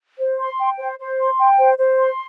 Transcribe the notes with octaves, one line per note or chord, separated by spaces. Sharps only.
C5
C6
G5
C5
C5
C6
G5
C5
C5
C6